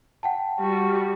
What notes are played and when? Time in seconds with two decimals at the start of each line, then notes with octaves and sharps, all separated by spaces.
0.23 F#5 G5 A5
0.59 G3 F#4